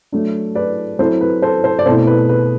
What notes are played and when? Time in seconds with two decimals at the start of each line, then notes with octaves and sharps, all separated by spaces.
0.12 F#3 A3 D4
0.55 B4 D5
0.99 F#3 C4 E4 A4 C5
1.21 B4
1.42 A4 C5
1.64 A4 C5
1.79 D5
1.86 B2 A3 C4 E4 A4 C5
2.07 B4
2.29 B4